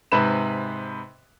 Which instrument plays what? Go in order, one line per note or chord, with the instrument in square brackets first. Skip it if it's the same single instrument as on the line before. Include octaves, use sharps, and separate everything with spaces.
[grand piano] G#2 C3 B4 B5 E7